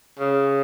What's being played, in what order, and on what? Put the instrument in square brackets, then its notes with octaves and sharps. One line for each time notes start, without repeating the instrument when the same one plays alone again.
[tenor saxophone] C#3